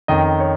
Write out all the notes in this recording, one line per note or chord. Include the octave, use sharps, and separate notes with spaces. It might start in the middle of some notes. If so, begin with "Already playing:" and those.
F2 D#3 C#4 D#5
C#5